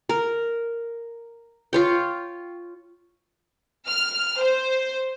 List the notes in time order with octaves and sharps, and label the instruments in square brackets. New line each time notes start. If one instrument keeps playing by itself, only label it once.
[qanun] A#4
F4 C#5 G5
[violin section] F6
C5